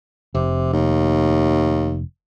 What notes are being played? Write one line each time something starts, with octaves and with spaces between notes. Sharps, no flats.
F1 C3
D#2